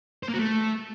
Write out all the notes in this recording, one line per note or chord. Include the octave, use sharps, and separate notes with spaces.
C5
A#3
F#4
A3